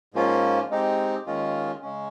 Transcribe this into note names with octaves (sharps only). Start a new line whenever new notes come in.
G#2 F3 A#3 C#4 F4
G#3 C4 D#4 G4
D#2 D#3 G#3 C#4 F4
C#3 G#3 C#4